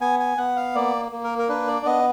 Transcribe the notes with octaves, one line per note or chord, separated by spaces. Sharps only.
B3 G#5
G#5
B3 F#5
F5
A#3 D5
A#3
A#4
A#4
D4 B4
D5
B3 D#5